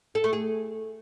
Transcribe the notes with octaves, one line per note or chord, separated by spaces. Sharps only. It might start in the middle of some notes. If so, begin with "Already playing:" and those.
A4
A3
G#4